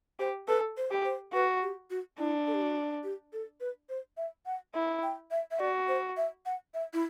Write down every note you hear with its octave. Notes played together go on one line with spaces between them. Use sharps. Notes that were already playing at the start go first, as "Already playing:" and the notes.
G4 C5
A4 B4
C5
G4
C5
F#4 B4
G4
F#4
D4 E4
A4
G4
F#4
G4
A4
B4
C5
E5
F#5
E4
G5
E5
E5
F#4 D5
C5
E5
F#5
E5
E4